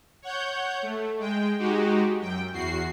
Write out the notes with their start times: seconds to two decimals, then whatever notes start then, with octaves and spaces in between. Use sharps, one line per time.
0.22 C#5 F#5 G6
0.82 A3
1.18 G#3 G5
1.59 G#3 D#4 F#4 G4
2.21 F#2 G5
2.52 E2 F#4 C7